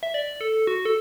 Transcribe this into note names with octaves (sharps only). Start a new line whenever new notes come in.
E5
D5
A4
F#4
A4